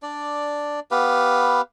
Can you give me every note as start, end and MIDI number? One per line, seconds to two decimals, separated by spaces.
0.03 0.80 62
0.03 0.80 74
0.91 1.61 59
0.91 1.61 67
0.91 1.61 71
0.91 1.61 77